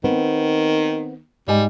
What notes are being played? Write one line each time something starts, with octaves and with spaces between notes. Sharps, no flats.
D#3 B3 C4
G#2 G3 D#5 G#5